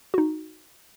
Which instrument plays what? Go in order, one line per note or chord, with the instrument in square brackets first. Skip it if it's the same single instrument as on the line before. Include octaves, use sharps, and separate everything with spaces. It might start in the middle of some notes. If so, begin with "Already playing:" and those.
[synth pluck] D#4 F#4